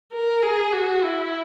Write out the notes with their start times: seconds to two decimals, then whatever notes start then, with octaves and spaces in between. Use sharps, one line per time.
0.13 A#4
0.42 G#4
0.73 F#4
1.04 E4